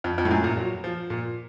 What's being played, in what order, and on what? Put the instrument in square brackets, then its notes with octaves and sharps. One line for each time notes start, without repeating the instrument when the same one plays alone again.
[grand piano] F2
F2
A2
F#2
A#2
F#3
F3
A#2